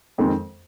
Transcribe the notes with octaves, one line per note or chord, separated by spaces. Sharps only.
F2 D#3 G#3 C4